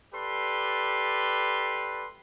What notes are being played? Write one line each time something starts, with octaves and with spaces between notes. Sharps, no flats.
G4 A4 B4 D5 C6